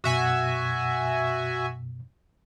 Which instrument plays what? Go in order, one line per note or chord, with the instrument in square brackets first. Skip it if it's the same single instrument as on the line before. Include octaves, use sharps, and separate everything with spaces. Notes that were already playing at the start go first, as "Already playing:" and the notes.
[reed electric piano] F#2 B2 [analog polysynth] F#4 E5 G#5